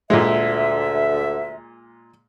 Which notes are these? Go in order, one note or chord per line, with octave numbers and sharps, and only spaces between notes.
D2 A#2 D3 G#3 E5